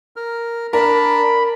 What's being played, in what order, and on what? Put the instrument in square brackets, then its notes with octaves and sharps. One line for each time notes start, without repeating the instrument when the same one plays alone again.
[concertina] A#4 F6
[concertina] D4 A5 [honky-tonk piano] A#4 [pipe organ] B5